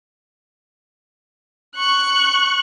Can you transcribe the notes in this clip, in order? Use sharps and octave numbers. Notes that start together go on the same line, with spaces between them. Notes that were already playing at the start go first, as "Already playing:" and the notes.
C#6 F#6